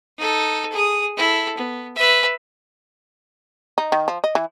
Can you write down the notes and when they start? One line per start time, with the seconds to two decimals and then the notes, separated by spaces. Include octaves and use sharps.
0.18 D#4 A4
0.72 G#4 D#6
1.17 E4 A4
1.57 B3
1.96 B4 E5
3.78 D#4
3.92 D#3
4.08 F3
4.24 D#5
4.35 E3